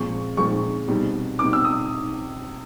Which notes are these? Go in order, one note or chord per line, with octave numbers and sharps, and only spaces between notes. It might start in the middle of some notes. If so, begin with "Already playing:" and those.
Already playing: A#2 F3 G#3 C4 C#6
A#2 F3 G#3 C4 C#6
B2 G3 C4 D#4
B2 G3 C4 D#4 D6
E6
D#6